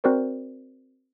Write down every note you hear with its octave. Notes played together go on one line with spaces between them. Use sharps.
C4 F#4 A#4 C5 D5